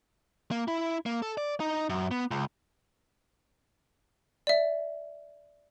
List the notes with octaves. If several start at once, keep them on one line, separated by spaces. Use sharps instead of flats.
A#3
E4
A#3
A4
D5
D#4
F#2
B3
C#2
D5 E5